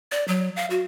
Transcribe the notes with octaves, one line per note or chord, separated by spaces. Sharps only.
D5
F#3
F5
F#4